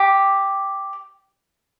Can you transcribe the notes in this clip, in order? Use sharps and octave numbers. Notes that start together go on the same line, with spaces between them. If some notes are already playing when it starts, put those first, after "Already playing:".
Already playing: G4